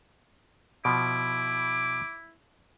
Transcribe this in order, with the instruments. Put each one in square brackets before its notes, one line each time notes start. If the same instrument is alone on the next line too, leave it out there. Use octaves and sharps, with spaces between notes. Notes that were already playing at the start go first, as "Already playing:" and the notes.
[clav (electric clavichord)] B2 F3 [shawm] E4 [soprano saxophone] D6